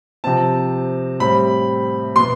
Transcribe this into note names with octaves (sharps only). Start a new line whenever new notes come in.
C3 F3 C4 A5
A2 G3 C4 B5
B2 B3 C6